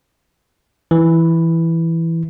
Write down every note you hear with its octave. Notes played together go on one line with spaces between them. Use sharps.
E3